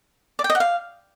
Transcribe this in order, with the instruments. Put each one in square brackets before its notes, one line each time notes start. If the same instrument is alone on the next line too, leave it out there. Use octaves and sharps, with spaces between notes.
[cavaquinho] D5
G5
D#5
F#5
F5